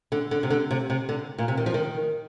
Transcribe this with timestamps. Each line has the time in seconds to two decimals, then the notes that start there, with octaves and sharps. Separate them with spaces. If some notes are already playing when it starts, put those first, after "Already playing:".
0.12 D3
0.31 D3
0.43 C3
0.50 D3
0.71 C3
0.90 C3
1.09 D3
1.38 A#2
1.48 C3
1.57 D#3
1.66 F3
1.74 D#3